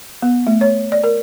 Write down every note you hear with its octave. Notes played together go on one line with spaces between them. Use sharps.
B3
A3
C#5
D5
A#4